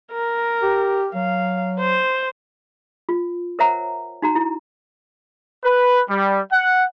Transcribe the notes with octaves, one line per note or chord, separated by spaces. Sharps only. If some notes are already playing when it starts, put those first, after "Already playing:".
A#4
G4
F#3 F5
C5
F4
A#4 C5 C#5 E5 F#5 A#5
D#4 F#4 A#5
E4
B4
G3
F#5